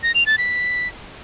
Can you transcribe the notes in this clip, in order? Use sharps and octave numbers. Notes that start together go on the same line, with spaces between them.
A#6
F7
A6
B6